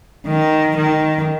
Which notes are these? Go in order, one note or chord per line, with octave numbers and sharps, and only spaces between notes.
D#3
D#3